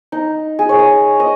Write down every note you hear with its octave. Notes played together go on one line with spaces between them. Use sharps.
D#4
G#4
C#5
D#5
D#5